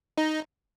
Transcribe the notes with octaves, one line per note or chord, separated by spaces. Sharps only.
D#4 D#5